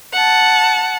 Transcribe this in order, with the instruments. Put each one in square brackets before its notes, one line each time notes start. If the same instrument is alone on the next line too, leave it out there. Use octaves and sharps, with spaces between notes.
[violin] F#5 A5